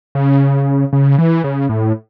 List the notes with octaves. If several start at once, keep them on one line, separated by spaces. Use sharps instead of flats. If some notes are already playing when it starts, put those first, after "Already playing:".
C#3
C#3
E3
C#3
A2